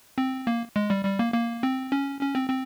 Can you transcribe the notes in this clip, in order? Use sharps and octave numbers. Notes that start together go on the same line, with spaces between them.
C4
A#3
G#3
G3
G3
A#3
A#3
C4
C#4
C#4
C4
C4